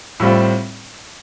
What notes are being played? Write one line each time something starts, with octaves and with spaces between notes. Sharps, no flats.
A2 G3 C4 F4